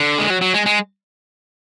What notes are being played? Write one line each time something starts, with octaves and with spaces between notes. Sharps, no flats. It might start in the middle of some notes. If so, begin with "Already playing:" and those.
Already playing: D3
G#3
F#3
F#3
G#3
G#3